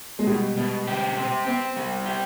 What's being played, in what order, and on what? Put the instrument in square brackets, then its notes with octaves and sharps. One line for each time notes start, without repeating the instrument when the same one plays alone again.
[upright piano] G#3
[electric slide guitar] B2 [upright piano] G3
[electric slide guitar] B2
G4
C4
[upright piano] B3 [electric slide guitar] C4
[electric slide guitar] G3
G4